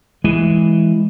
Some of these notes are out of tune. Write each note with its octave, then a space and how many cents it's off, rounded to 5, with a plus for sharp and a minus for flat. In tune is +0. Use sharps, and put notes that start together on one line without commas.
E3 +0 G#3 +0